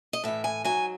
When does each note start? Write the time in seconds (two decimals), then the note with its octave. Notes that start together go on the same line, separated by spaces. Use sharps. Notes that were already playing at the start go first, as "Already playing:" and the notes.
0.13 D#5
0.24 A2 E3 E5
0.44 G#5
0.65 G#2 F#3 G#5